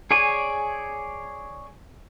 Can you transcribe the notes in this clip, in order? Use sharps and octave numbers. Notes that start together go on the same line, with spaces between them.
G#4 C#5 D5 G#5